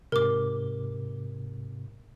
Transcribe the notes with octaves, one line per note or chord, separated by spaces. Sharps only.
G#2 C3 A#4 D6